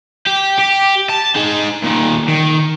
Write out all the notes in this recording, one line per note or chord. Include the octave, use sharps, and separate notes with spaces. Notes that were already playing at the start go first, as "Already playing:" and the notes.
G4
G4
A5
D#4 G#4
A#2 D#3
D#3